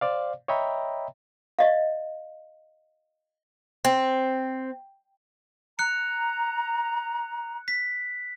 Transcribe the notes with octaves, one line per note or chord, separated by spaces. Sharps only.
C5 D5 F5
C#5 D#5 E5 G5 A#5 B5
D5 D#5 F5
C4
A#5 F#6 C#7
B6